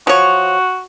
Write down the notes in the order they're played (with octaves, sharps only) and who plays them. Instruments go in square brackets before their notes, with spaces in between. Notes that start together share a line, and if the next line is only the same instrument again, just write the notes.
[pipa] F3 C#5 [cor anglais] F#4